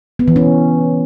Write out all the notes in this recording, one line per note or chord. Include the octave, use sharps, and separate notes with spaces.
B3
E3
C#4